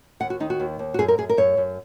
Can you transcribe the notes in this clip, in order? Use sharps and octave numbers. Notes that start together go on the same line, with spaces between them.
D#2 F#5
F#4
D#3 D#4
F#4
D#2
D#2
F#4
F#2 G#4
A#4
F#2 G#4
A#4
F#2 C#5
F#2